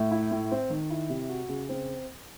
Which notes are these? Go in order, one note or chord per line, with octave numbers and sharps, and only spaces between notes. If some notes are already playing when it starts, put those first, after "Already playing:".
Already playing: A2
E4
A2
C4
D#3
E4
C3
F#4
C#3
C4